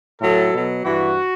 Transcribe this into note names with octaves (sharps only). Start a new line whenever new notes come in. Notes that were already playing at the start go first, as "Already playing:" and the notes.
A2 F#3 A4
B2 F#3
G2 E3 F#4